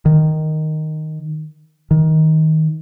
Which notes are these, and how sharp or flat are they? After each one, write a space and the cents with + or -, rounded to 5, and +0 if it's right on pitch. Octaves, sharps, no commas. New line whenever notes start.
D#3 -5
D#3 +20